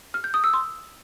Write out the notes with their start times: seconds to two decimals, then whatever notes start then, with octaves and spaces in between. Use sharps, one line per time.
0.14 F6
0.24 G6
0.34 D#6
0.44 E6
0.54 C6